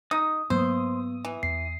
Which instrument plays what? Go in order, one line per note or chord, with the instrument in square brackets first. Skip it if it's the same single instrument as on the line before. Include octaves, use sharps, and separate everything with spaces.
[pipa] D#4 [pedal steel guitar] D#6
[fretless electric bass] G#2 F#3 A#3 [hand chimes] B3 [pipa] C5
[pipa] E3
[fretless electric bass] E2 [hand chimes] C7